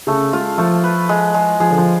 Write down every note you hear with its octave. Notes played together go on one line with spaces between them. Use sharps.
C#3 A3
G#3 F4
F3 A3
B4
G#3
G#3
F3 G#4
D3
F3